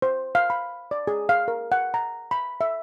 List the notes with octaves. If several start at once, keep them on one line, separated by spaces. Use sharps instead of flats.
C5
F5
B5
D5
G#4
F5
A#4
F#5
A#5
B5
E5